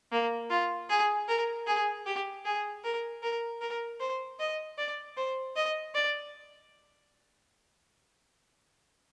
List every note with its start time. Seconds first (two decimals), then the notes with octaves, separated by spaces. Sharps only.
0.12 A#3
0.51 F4
0.90 G#4
1.28 A#4
1.67 G#4
2.06 G4
2.45 G#4
2.84 A#4
3.23 A#4
3.61 A#4
4.00 C5
4.40 D#5
4.78 D5
5.17 C5
5.56 D#5
5.95 D5